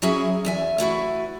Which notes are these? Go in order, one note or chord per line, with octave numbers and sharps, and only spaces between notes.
F#3 C#4 E4 F#4 G#4 E5
E2 E5 G#5
A3 E4 F#4 B4